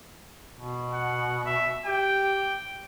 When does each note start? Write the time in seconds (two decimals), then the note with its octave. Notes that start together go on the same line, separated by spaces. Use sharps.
0.56 B2
0.94 F#5
1.46 E5
1.86 G4 G5